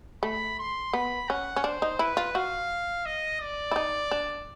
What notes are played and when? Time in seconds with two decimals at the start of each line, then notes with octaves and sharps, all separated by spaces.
0.23 A3 B5
0.59 C6
0.93 B3 B5
1.29 C#4 F#5
1.56 C#4
1.64 D4 C5
1.82 D#4
1.99 E4 B4
2.17 F4
2.35 F#4 F5
3.06 D#5
3.41 D5
3.71 E4
3.76 D#4
4.11 D4